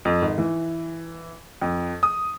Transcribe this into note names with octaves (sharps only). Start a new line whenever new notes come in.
F2
G#1
E3
F2
D#6